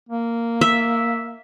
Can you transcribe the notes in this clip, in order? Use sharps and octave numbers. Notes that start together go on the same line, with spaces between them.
A#3
E5